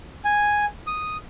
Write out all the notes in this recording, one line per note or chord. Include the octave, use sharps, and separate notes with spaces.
G#5
D#6